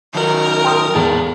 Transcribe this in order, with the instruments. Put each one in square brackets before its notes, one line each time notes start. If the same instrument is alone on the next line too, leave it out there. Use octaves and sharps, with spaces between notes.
[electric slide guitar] D#3 F#3 D#4 [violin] A#4
[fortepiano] G5 C6 D#6
[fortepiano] E2 [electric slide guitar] A#2 A4